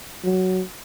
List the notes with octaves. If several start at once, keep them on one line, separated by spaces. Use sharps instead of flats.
F#3